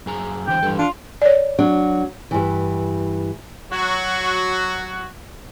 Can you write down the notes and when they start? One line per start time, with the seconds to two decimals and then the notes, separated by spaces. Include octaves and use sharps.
0.06 F#2 G#4 A#5
0.47 D3 E3 C5 G5
0.63 G2 E3 A4
0.79 D4 F4
1.22 C#5 D5
1.59 F#3 D4
2.31 G2 E3
3.71 F#3 F#4